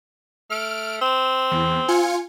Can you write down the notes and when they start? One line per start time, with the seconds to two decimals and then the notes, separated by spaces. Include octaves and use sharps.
0.50 A3 F6 D7
1.01 C4 E7
1.51 E2
1.88 F4 G#5 C#7